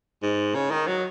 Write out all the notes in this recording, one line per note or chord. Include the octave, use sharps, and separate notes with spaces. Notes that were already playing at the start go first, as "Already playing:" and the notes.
G#2
C#3
D#3
F#3